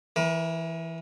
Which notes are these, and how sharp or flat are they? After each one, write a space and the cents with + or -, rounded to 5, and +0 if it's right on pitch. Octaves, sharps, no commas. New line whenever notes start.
E3 +0 A#4 +35